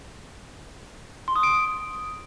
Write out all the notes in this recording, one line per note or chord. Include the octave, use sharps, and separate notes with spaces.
C6
D#6
D7